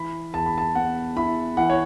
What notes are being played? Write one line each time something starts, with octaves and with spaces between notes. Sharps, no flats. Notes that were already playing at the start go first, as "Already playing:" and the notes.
Already playing: E3 B5
E2 A5
B5
A5
B3 F#5
E4 B5
E3 F#5
C#5